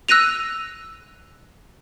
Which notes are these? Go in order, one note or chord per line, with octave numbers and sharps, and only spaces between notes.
E6 F#6 A#6 D#7 F7